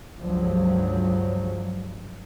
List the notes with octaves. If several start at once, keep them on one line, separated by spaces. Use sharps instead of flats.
C#2 G2 F3 F#3